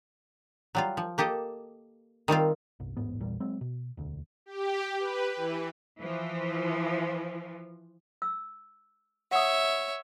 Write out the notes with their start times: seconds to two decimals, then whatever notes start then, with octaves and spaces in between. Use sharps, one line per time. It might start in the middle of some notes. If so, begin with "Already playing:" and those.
0.75 F#3 G3 F4
0.97 F3
1.18 A#3 G4 A4 D#5
2.28 D#3 G3 C4 F4
2.80 G1 C2
2.97 A1 E2 G#2 B3
3.20 A#1 E2 A#2 G3
3.40 F#3 G#3 C4
3.61 B2
3.97 E1 D2
4.46 G4
5.00 B4
5.36 E3
6.01 E3 F3
8.22 E6
9.31 C#5 E5 F#5 D#6